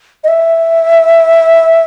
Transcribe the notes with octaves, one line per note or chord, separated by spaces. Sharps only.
D#5
E5